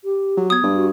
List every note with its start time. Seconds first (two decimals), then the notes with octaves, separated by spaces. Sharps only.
0.04 G4
0.37 F#3
0.50 B3 D#6 G#6
0.63 G2
0.75 F#4